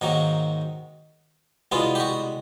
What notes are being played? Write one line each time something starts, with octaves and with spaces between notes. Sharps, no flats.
G#2 D#3 F#3 A#3
C2 B2 G#3 B3 F4
G4
F#4